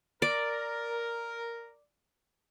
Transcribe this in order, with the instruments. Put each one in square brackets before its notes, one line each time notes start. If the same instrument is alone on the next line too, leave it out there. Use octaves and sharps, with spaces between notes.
[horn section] A#4 [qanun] D5